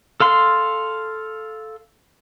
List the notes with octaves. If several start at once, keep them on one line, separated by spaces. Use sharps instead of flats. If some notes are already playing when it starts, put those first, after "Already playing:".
A4 F5 C6